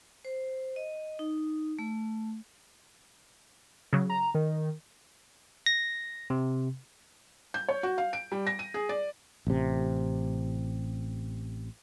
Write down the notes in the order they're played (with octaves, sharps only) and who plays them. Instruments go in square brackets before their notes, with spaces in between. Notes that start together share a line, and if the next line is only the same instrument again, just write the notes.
[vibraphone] C5
D#5
D#4
A3
[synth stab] C#3 F#3
[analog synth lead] A#5
D#3
[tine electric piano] A#6
C3
[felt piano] G6
C#5
F#4
F5
D7
G3
A#6
D#7
G#4
D5
[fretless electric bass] A1 C3